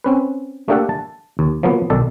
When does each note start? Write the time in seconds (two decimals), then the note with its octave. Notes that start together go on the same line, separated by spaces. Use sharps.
0.04 C4 C#4 B4
0.68 A3 A#3 D4 G4 A4 F#5
0.89 A5
1.39 D#2
1.63 F3 F#3 A#3 B3
1.90 B1 D#3 A4 D5